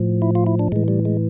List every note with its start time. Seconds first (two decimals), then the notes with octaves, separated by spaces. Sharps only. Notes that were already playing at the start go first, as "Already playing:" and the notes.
Already playing: A2 F3
0.22 E4
0.35 F4
0.46 E4
0.59 D4
0.72 A2 E3 G#3
0.88 G3
1.05 G#3